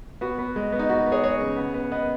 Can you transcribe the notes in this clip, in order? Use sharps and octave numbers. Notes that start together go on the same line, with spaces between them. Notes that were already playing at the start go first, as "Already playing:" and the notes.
B3 F#4
B3
G#3
B3
D#4
B3 F#4
B3
G#4 C#5
G#3 G#4 C#5
C#3
B3
B3
B3 B4 D#5